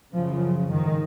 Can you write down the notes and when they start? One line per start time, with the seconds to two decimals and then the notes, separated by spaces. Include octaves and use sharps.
0.14 F#2 C#3 F3
0.71 G#2 D#3